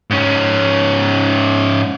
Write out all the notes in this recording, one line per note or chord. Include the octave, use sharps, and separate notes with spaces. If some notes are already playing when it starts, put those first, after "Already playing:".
G#2 C#4